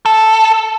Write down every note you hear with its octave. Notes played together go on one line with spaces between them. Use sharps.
A4